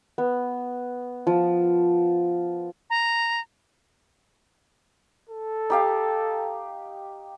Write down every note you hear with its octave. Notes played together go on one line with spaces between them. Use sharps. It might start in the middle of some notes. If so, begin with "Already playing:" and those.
B3
F3
A#5
A4
D#4 G4 F5